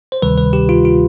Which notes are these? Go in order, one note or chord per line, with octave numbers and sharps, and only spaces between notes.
C5
D2 C3 D#3 G3 B4
B4
G4
F4
F4